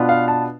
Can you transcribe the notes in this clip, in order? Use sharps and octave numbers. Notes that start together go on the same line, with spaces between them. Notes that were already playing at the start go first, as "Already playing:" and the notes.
Already playing: B2 B3 D4 F4
F5
A5